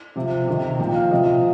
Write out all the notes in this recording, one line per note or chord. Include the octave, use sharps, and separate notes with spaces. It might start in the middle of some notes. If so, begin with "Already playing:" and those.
C3 F3
C3 D#3
A#2 F3 G5
F5
C3 F3 D#5